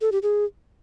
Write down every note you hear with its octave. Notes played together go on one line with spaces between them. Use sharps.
A4
G4
G#4